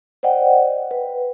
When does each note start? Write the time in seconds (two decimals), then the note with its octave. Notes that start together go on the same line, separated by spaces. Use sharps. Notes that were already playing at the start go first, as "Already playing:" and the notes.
0.23 C5 D5 D#5 F#5 G5
0.91 B4